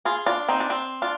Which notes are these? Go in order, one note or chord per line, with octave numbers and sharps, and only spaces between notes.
F4 G#4
D4 F4
C4 D#4
D4
C4
D4 F4